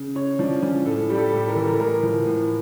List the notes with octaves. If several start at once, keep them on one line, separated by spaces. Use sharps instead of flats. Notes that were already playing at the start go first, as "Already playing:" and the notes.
Already playing: C#3
C#3 C#5
F3 D4
F3 C#4
A2 A4
G3 G4
A4
A2
A#4
E3 A4
A#4
A2 A#4
F3
A2